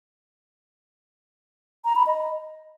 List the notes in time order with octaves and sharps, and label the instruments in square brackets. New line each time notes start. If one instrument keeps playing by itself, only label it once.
[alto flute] A#5
B5
D#5